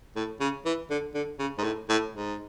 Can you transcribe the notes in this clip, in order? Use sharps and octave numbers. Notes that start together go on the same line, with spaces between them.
A2
C#3
E3
D3
D3
C#3
G#2
A2
A2
G#2